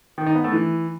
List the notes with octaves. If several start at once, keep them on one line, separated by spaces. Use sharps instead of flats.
D#3
D#4
B3
A3
E3